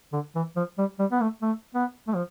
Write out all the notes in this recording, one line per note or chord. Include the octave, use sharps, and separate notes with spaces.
D3
E3
F3
G3
G3
B3
A3
A3
B3
A3
F3